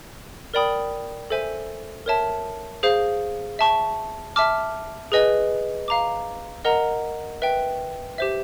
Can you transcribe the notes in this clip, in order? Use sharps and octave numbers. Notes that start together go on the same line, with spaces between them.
A#4 D5 G5 B5 D#6
A4 C5 E5 G#5
A#4 C#5 E5 A5
G#4 C5 F5
E5 A5 C#6
E5 A5 D6 F6
G#4 B4 D#5 G#5
F5 A#5 D6
A#4 D#5 F#5 A#5
B4 E5 G5
G4 C5 E5